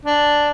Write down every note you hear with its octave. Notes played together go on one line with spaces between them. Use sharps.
D4